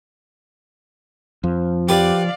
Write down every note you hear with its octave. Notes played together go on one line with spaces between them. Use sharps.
F2 F3
G4 B4 D5 F5